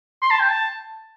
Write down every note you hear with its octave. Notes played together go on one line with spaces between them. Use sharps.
C6
A5
G5
A5